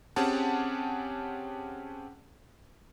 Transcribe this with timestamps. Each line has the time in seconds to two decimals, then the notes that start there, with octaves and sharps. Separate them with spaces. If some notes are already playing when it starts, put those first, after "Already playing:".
0.16 C4 C#4 G4 G#4 F#5 A5